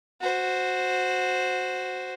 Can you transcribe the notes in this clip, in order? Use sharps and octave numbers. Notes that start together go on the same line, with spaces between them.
F#4 C5